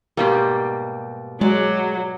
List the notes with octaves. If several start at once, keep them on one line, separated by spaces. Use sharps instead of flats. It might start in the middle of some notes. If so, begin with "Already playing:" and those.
G#2 B2 G3 A#3 G4
F#3 G#3 D5